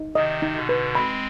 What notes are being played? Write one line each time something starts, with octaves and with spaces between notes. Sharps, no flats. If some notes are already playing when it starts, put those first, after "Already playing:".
Already playing: D#4
C3 D#3 D#5
D#4
B2 D3
B4
G#3 C4 B5